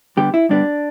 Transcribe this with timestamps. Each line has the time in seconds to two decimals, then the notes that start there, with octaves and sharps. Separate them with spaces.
0.17 G2 D3 G3 B3 G4
0.34 E4
0.49 G2 D3 G3 B3 D4